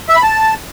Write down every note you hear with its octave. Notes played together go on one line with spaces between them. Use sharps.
E5
B5
A5